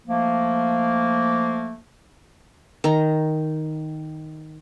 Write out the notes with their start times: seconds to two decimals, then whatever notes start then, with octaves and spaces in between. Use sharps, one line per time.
0.07 F3 A3 A#3
2.84 D#3 A#5